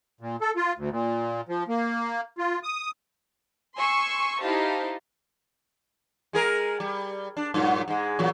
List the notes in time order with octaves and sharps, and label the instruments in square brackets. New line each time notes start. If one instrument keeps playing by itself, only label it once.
[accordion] A#2
A4
F4
D2
A#2
F3
A#3
F4
D#6
[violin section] G#5 C6 C#6 E6
D#4 E4 G4 C5 F5 A5
[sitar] G#3 G#4 A#4
G3
D4
G2 A#2 F#3
G#2 G#3
E2 A#2 F#3